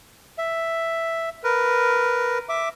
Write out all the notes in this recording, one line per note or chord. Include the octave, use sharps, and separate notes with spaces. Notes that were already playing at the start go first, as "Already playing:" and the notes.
E5
A#4 B4
E5 D6